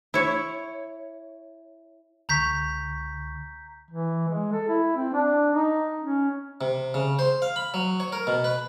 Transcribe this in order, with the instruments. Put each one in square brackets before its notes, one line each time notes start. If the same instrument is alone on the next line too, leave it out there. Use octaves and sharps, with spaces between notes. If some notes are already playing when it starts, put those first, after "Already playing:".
[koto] E4 C#5
[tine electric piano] C#2 D3 C#6 [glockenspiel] A#5 G6 B6
[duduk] E3
G#3
A4
E4
C4
D4
D#4
C#4
[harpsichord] C3
C#3
C5
F5
B5
F#3
C#5
A#4
B2
B4